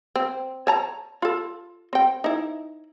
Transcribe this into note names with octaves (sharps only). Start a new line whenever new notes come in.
C4
C#5 A5 A#5
F4 A4
C4 G5
D#4 E4